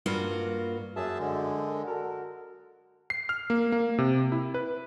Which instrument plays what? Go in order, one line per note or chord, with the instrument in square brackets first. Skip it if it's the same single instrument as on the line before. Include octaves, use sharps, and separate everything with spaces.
[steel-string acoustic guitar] G2 A#3 F4 F#4
[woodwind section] F#2 [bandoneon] G#4 E5 A5
[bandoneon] D3 G#3
[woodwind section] F#4 A4 A#4
[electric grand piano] C7
F6
A#3
A#3
C3
E4
B4